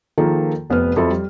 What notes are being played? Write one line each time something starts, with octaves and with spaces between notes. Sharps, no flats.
D#3 F3 A#3 G#4 A4
F1 B3 C4 B4 F6
F2 F#3 A4 C5 E5 B5
G3